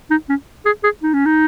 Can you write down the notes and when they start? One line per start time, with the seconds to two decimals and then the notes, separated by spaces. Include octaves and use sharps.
0.11 D#4
0.29 C#4
0.66 G#4
0.84 G#4
1.03 D#4
1.14 C#4
1.26 D#4